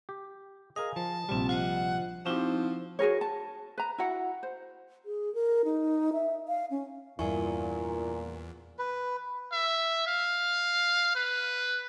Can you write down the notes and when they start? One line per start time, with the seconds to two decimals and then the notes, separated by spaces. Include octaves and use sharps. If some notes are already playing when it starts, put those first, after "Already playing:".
0.09 G4
0.76 G#4 A#4 D#5 F5 G#5
0.96 F3 A5
1.29 A#1 C3 G3 C4 F4
1.49 F4 C5 D#5 F#5
2.26 F3 C4 D#4 E4 F#4 G4
2.99 F#4 G#4 A#4 C#5
3.21 A5
3.78 B4 A#5
3.98 E4 F#4 F#5
4.43 C5
5.06 G#4
5.35 A#4
5.65 D#4
6.13 E5
6.48 F5
6.71 C#4
7.19 E2 G2 A#2 E4 A#4 G#5 C#6
8.79 B4
9.52 E5
10.07 F5
11.15 B4